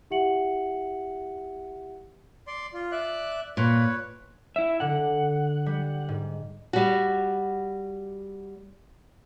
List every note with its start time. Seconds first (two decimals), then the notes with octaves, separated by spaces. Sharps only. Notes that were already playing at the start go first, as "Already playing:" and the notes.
0.10 E4 G4 E5 F#5 C#7 F#7
2.47 D5 C6
2.74 F4
2.92 D5 E5 F#6
3.57 A#2 B4 C#5
4.56 E4 E5
4.80 D3 D4 F#5
5.66 G3
6.09 G#2
6.73 G3 F#4